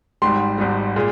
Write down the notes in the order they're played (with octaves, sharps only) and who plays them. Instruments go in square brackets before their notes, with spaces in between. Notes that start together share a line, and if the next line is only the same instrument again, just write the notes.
[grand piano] G#1 G#2 G3 C6
G#1 G#2 G3
A#2 G#3